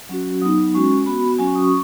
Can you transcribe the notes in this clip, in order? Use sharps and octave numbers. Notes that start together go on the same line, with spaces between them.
F#3 C#4 F#4
F#3 B3 D#4 D#6
G#3 C#4 F#4 C#6
B3 F#4 B5
F#3 C#4 F#4 G#5
C#6
D#6
C#6